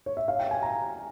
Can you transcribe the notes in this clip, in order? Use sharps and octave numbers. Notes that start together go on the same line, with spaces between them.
C#5
E5
F5
G5
G#5
A#5